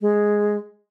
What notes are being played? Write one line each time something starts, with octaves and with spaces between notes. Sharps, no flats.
G#3